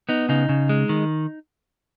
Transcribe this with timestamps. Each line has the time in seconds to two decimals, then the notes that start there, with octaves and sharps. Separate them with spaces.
0.09 B3 D#4
0.29 C#3 D#4
0.49 C#3
0.69 G#3
0.89 D#3